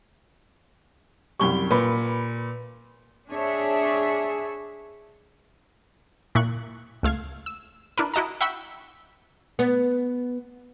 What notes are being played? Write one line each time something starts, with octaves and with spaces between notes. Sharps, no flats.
C2 F#2 G3 C#6 G7
A#2 B4
D4 G#4 C#5 E5
A#2 E4 C#6 F#6
C#2 A3 F5 G#6 C7
E6
D4 E4 A#4 B4
E4 F#4 D#5 A5 A#5
E5 F#5 G5 B5 C#6 E6
B3